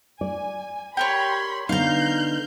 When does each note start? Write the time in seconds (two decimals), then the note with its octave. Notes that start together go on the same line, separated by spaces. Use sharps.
0.21 D5 G#5
0.97 G4 A#4 C#5 B5 C6
1.69 D3 B3 D#4 F5 A#5 F6 G6